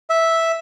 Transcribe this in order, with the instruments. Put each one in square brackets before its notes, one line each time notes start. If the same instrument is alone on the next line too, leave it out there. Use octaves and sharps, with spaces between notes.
[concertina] E5